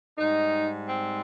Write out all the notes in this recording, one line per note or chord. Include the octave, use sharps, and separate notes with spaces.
G#2 G3 D#4
C4